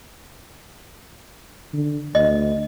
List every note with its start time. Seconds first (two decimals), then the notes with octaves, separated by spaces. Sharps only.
1.74 D3
2.15 D2 D#5